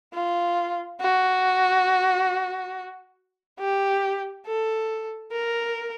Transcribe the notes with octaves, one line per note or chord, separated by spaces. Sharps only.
F4
F#4
G4
A4
A#4